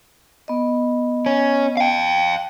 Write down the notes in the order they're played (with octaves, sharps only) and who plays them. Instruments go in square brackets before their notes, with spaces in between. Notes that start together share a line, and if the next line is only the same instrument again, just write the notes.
[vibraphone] B3 D#5
[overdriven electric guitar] C#4
F5 G5